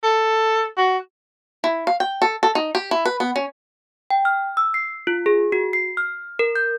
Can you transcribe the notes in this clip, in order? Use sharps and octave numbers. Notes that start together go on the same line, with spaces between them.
A4
F#4
E4
F5
G5
A4
A4
D#4
G4
E4
B4
B3
C#4
G5
F6
E6
C7
F4
G#4
F#4
C7
F6
A#4
G6